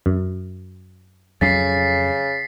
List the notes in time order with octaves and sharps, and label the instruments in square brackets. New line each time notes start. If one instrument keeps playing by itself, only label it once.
[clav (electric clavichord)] F#2
[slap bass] F2 F#3 C#4 [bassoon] C#3 [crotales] A6 B6 C7